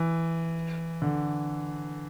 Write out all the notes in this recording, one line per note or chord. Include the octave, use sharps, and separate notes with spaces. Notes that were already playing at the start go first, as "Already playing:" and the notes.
Already playing: E3
D3